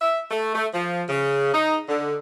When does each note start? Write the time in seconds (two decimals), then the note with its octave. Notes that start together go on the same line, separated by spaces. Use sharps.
0.01 E5
0.31 A3
0.55 A3
0.73 F3
1.09 C#3
1.53 D#4
1.89 D3